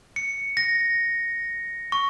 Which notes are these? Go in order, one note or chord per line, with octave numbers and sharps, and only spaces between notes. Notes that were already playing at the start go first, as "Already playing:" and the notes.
C#7
A#6
C#6